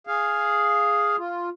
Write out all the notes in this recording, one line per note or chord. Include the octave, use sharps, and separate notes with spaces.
G#4 F5
F4